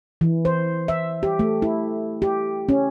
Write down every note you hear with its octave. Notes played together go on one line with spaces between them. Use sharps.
E3
C5
E5
G4
A3
E4
G4
C#4